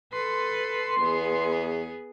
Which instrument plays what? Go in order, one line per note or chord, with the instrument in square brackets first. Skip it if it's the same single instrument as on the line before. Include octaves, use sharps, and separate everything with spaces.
[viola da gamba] A4 B4 [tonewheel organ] C6
[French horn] E2 [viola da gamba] B3 G#4